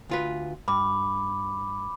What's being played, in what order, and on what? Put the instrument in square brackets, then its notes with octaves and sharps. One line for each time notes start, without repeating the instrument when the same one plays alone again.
[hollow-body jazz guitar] D2 F4 B4
[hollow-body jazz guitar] G2 [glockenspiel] B5 D6